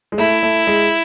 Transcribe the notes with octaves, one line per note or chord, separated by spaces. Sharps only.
G#3
A3 E4
A3
G#3